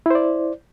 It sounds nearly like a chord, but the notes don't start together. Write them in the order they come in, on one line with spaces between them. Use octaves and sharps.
E4 C5 D5